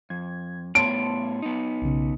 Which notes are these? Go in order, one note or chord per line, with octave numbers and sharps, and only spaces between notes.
F2 G#6
A2 B3 C#5 A5 C6 D7
B3 D#4
B1 C#3